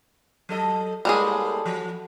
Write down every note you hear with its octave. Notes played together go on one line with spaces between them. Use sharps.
F#3 A4 D#5
A2 G3 G#3 A#3 G#4
F3